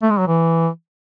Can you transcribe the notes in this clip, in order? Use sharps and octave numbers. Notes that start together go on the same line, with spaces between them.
A3
G#3
F#3
E3